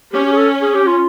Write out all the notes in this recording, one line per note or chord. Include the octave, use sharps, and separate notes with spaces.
C#4 G4
G4
G#4
A4
G#4
G4
F4